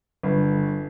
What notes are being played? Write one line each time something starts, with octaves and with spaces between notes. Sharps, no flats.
G1